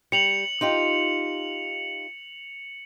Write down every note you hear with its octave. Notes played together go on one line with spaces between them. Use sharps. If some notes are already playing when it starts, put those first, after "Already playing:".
G3 C#7 F7 F#7
D#4 F4 G4